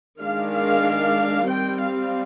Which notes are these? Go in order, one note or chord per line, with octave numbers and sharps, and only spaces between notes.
D#3 G#3 D4 F5
F5
G3 C4 G5
F5